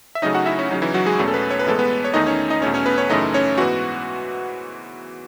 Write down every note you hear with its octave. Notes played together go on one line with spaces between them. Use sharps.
E5
C#3 F#3 A3 C#4 D#4 D#5
F#4 F#5
E4 E5
C#4
C#3 F#3 C#4 D#4
E3 E4
F#3 F#4
G#3 G#4
E2 B2 A3 C#4
A4
B3 B4
C#5
B4
A2 E3 G#3 B3 A4
B3 B4
C#5
E2 D#3 A3 D#4 D#5
C#4 C#5
D#4 D#5
E2 B2 A3 C#4 C#5
C#4 C#5
B3 B4
C#4 C#5
F#2 C#3 E3 A3 D#4 D#5
C#4 C#5
G#2 E3 B3 F#4 F#5